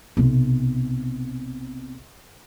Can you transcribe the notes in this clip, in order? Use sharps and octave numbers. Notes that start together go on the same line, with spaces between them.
B1 C3